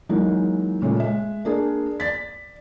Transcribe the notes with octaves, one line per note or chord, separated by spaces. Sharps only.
E3 F#3 G#3 A#3 D#4
A#2 C#3 G#3 A3
G#3 E5
A#3 D4 G#4
D5 A6 B6